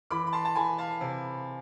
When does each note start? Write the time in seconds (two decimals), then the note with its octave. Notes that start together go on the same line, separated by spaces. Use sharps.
0.11 E3 B5 D6
0.27 B5
0.33 A5 C6
0.45 A5
0.55 E3 G#5 B5
0.78 F5 A5
1.01 C3